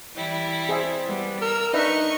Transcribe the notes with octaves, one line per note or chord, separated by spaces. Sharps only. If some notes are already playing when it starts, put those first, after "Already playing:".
E3 G3 E4
C4 G#4 E5
G3 B3
A#4 E6
D4 D#4 B4 D#5 E5 C#6